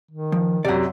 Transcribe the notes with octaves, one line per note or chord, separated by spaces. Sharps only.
D#3
F3
F#2 C3 D5 F#5